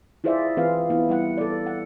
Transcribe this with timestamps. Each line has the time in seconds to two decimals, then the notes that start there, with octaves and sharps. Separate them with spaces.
0.24 E4 F4 G#4 C5 D5 E5
0.57 E3 C4 F4 G#4 B4 F5
0.90 E3 B3 E4
1.09 G3 E4 F#5
1.38 A4 D5
1.66 F#5